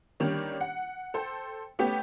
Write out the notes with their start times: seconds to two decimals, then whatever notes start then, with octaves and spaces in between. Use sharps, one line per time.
0.20 D#3 G3 A#3 C#4 D4
0.61 F#5
1.14 A4 C5 G5
1.79 A3 B3 C#4 G4